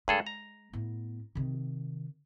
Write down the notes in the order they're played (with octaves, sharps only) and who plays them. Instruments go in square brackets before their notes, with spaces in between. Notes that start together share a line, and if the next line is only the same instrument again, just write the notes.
[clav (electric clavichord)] G2 G#4 A4 [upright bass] G#3
[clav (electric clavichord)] A#5
[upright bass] A2 B3
C3 D#3